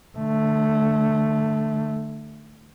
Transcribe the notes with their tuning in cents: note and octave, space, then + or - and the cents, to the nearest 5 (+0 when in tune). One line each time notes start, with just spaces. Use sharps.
D3 +25 A3 +0